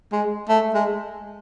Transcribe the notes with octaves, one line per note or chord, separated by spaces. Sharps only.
G#3
A3
G#3